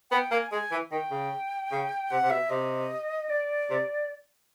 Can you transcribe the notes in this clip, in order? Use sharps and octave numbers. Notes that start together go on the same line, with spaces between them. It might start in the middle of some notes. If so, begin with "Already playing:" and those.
B3 G5
A#3 G#5
G#3 G#5
E3
D#3 G5
C#3
C#3
C3 F#5
C3
B2 E5
C3 D#5
D5
C3